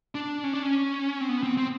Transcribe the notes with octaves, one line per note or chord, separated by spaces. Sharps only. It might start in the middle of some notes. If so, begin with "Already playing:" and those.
D4
C#4
D4
C#4
C4
B3
C4
C4